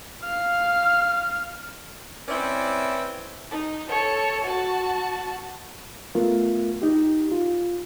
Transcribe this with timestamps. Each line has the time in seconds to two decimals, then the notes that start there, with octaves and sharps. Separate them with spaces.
0.24 F5 F6
2.29 C4 C#4 E4 B4 D5
3.51 D#4
3.88 A4 C#5
4.44 F#4 A5
6.15 A3 B3 F4 A#4
6.82 D#4 G4
7.31 F4